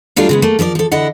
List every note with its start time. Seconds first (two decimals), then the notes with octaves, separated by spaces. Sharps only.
0.16 F#3 G3 A3 D4 F4
0.29 C#3 G#3 B3
0.42 A3 A#3
0.59 F3 A#4 C5 D5
0.75 F3 A4
0.92 D3 E4 D#5 F#5